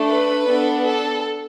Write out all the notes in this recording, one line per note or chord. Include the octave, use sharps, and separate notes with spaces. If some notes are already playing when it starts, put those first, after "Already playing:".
Already playing: A3 D4 A4
B4
B3 D4 A4
A4